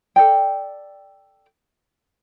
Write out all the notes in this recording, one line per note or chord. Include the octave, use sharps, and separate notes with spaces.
A4 D5 G5